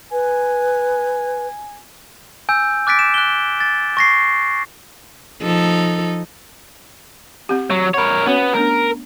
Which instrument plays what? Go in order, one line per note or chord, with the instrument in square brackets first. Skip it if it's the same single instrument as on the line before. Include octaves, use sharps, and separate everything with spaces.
[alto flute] B4 [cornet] G#5
[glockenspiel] G#5 E6 G6
D6 F#6 A6 B6 D7
E7
F#6 G7
A6
C#6 A#6 C7
[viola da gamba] F3 D#4 A4
[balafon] C4 G4
[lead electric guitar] F#3
[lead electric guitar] A#4 C#5 [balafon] F#5 B5
[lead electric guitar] B3 [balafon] C#4 F#4 C#5
[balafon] A3 B3 D4 [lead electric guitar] A#4